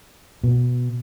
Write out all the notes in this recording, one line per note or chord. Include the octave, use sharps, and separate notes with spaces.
B2